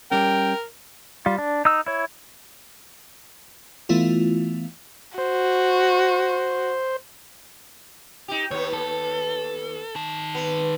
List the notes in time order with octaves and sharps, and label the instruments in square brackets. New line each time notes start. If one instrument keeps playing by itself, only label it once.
[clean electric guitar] G3 C#4 [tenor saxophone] A#4 [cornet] G5
[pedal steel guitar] G3 F4
D4
D#4 E6
E4 C#5
[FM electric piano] E3 A3 B3 E4 F4
[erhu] F#4 [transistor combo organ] C5
[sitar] D#4 G4
[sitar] D#2 B3 [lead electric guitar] C#5
[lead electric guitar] A4
D#3 A5
[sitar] B3